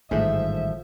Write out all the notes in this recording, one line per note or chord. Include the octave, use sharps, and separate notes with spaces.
A1 G#2 D#3 F3 G3 A3 G#4 E5